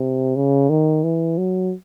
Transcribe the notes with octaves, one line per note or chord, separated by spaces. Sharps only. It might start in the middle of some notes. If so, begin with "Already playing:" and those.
Already playing: C3
C#3
D#3
E3
F#3